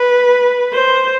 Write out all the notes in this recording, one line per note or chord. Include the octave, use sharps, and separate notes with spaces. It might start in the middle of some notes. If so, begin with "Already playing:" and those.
Already playing: B4
C5